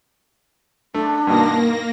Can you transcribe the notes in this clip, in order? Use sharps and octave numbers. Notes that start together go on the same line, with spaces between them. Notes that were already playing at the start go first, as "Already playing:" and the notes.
A3 D4
G2 B2 D#3 A#3 A#6